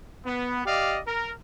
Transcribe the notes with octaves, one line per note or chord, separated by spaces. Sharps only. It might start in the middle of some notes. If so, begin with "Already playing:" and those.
B3
G4 D5 D#5 F5
A#4